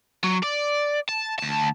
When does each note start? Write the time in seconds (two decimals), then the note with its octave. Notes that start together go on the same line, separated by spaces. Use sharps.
0.24 F#3
0.43 D5
1.09 A5
1.39 D2 A5